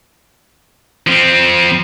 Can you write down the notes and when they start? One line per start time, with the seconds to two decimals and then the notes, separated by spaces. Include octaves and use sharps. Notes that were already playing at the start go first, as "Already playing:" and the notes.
1.07 F3 C4